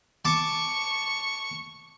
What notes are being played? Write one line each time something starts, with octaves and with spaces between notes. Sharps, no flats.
A5 C#6 D6